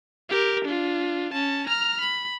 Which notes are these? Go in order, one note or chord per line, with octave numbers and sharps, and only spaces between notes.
G4 A#4
D4 F4
C#4 A5
A#5 F6
B5